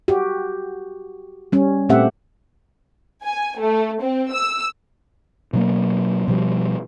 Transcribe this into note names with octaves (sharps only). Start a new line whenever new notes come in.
F#4 G4
G3 C#4
A#2 A3 C4 G4 E5 F#5
G#5
A3
C4
E6
B2 F#3 A#3
B2 F3 G3